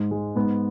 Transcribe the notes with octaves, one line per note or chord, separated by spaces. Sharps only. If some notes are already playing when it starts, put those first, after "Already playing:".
Already playing: G#2
G#3
G#2 B3